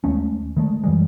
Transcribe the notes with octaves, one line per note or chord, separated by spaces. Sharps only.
D#2 G#3 A3 C#4
D#3 G#3 A3
F#2 E3 G3 G#3